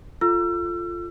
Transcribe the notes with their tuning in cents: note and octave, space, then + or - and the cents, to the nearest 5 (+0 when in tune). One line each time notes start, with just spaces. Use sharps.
F4 -5 A4 +0 E6 +35